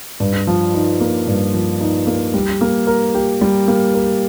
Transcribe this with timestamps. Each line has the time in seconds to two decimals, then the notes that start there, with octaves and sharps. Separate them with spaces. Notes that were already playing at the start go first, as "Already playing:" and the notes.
0.20 G2
0.47 F3
0.74 D#4
1.00 A#3
1.27 G2
1.54 F3
1.81 D#4
2.07 A#3
2.34 G3
2.61 A#3
2.87 A#4
3.14 G4
3.41 G3
3.68 A#3
3.94 A#4